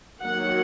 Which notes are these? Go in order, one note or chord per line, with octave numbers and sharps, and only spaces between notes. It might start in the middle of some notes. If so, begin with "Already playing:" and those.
D#3 F#3 A#3 F#5